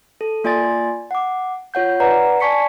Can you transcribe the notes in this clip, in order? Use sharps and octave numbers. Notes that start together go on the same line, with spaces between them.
A4
A#3 F4 D5 G#5 C6 A6
F#5 D6
F4 C#5 F#5 G6
B4 D5 F#5 A#5
D5 G#5 A5 C#6 B6 C#7